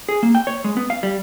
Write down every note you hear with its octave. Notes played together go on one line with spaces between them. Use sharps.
G#4
A#3
G5
C#5
G#3
B3
F5
G3